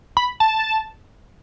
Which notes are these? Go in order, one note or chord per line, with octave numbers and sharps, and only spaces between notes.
B5
A5